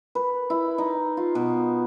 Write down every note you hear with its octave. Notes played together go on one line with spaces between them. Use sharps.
B4
E4
D#4
F4
B2